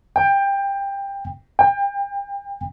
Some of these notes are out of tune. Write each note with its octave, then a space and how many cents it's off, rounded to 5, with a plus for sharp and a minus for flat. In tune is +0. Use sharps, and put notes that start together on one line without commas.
G5 +20
G5 +30